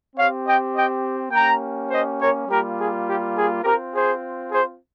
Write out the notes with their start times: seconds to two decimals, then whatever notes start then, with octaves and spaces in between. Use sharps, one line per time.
0.16 C4 G4 C#5 F5
0.46 D#5 G5
0.74 D#5 G5
1.32 A#3 C#4 G4 G5 A#5
1.91 C5 D#5
2.19 A#4 C#5
2.48 G3 A#3 F4 G4 A#4
2.77 G#4
3.05 G4
3.35 G#4
3.64 C4 F4 G4 A#4
3.93 G#4 C5
4.50 G#4 C5